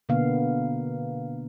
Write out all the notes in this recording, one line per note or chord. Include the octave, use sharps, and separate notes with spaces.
B2 D3 A#3 B3 F5